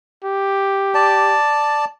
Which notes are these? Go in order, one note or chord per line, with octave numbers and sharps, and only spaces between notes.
G4
D5 A5